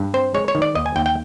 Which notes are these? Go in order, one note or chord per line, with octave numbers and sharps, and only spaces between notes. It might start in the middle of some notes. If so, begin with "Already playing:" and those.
Already playing: G2
C4 C5
G#3 C#5
C#5
D#3
D5
D#2 D#5
G#5
D#2 G5
G5